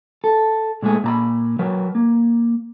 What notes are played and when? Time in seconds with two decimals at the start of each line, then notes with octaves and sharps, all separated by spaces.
0.24 A4
0.82 A#2 G#3 A3 G#4
1.04 A#2 A#5 B5
1.59 F#3 A#4 B4
1.95 A#3